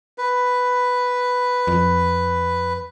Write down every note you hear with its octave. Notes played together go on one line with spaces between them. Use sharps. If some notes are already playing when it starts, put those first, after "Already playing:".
B4
F2